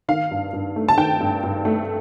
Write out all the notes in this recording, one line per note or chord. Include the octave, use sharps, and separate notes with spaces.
D#3 F5
G2
G2
A3
A5
D#3 G5
G2
G2
A3